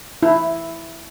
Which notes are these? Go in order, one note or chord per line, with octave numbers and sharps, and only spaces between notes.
E4